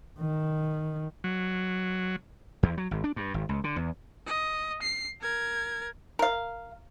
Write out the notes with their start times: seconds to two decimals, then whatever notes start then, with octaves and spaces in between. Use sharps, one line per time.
0.19 D#3
1.24 F#3
2.63 E2
2.77 F#3
2.91 G#1
3.04 D4
3.16 G2
3.34 G#1
3.49 C#2
3.64 D3
3.76 E2
4.27 D#5
4.82 C7
5.22 A#4 G#6
6.19 A#4 F5